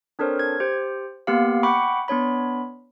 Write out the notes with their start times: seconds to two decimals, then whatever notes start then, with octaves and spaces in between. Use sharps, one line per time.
0.19 C4 D4 A4 A#4 C5 C#5
0.39 G#6
0.60 G4 C5
1.27 A#3 B3 G4 F5
1.63 F#5 G5 B5 C#6 D6
2.08 B3 D4 C#5 B5